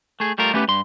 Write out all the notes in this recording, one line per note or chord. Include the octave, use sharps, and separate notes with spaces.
A3 G#4
G3 A3 F4 A#4
G3 A3 B3 C#4 G4 B4
G2 C6